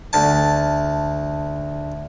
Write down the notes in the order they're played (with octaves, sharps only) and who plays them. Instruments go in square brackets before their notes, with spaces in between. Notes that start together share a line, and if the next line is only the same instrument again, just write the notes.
[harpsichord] D2 A5